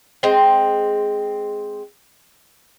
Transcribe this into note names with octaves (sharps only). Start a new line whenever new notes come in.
G#3 C4